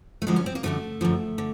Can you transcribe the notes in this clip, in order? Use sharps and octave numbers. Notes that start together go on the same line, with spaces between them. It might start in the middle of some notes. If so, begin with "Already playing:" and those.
A3
F#2 D3 F3 G#3
C#4
C4
A#3
F#2 D3 F3 A3
F#2 D3 F3
D3